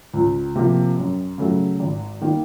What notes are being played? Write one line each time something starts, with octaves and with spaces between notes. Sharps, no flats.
C#2
C3 F3 A#3
F#2
C#3 F#3 A3
G#1
D#3 G3 A#3